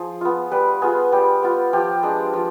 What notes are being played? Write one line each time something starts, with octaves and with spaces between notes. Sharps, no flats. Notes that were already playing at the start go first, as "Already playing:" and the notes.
Already playing: F3 G#4
B3 F4
G3 B4
B3 F4 G#4
G3 G4
B3 F4
F3 G4
G#3 D4
F3